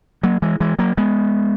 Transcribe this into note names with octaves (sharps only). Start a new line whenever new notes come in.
F#3 A#3
E3 G#3
E3 G#3
F#3 A#3
G#3 B3